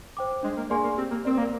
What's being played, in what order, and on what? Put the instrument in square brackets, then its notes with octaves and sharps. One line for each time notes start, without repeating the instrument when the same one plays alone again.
[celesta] C5 G5 D6
[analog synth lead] G#3 [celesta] D4
[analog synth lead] A#3
[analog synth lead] A#3 [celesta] G#4 D5 G#5 C6
[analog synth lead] A#3
[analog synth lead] C4 [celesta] G4
[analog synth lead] A#3
[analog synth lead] C4 [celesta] A#4 D5
[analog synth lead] A#3